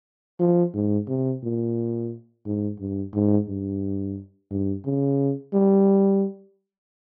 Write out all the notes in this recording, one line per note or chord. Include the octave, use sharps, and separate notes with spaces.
F3
G#2
C3
A#2
G#2
G2
G#2
G2
G2
C#3
G3